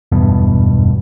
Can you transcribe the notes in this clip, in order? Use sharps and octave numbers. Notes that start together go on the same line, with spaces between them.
F#1 E2 G2 B2